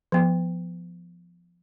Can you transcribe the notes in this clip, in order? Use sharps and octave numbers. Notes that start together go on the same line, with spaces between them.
F3 B3